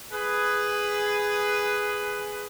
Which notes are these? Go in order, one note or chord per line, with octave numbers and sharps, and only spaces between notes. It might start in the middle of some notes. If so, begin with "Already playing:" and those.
G#4 B4